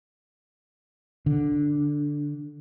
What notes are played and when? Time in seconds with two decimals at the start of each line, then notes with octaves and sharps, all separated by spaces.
1.26 D3